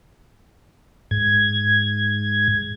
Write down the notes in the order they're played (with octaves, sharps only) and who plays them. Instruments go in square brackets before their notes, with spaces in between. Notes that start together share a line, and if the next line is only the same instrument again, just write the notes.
[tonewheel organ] G#2 G#6